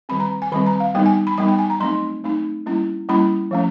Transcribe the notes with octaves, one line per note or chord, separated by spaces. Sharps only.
D#3 G3 C4 B5
A#5
G#5
D#3 G3 C4 B5
A#5
F5
G3 B3 D#4 G5
G#5
B5
G3 B3 D#4 B5
G5
G#5
A#5
F#3 A3 C4 D#4 C6
F#3 A3 C4 D#4
G3 A#3 C#4 E4
G3 A#3 C#4 E4 B5
F3 A3 C#4